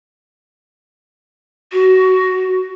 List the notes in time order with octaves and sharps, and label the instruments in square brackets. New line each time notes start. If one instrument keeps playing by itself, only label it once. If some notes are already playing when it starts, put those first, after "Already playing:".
[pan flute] F#4